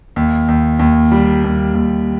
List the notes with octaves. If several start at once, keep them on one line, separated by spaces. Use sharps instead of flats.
D#2
D#2
D#2
G3
D#2
D#2